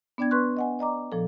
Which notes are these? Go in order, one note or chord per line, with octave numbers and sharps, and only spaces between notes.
B3 D4 D5 G5 G#6
B4 C6 C#6 F#6
D#5 F#5 G#5
D5 D#5 A#5 D6
A#2 F3 A4